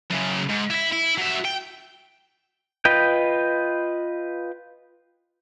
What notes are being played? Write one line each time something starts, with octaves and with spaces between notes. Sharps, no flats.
F#2 C#3
G#2
E4 E5
E4
F#3 E5
G5
F4 B4 D#5 G5